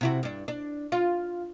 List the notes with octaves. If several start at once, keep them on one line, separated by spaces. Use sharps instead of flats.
C3 E4 F#4
G2 D4
D4
F4